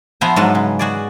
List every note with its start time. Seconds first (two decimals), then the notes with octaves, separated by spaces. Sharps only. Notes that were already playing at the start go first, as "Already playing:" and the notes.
0.21 F3 B3 C5 E5 G#5 A#5
0.36 G#2 F#3 G#3 D#4 B4 A5
0.55 C#3
0.79 F#4 G#4 D5